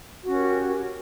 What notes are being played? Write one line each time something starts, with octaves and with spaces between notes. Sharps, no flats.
C#4 F#4 G4 A#4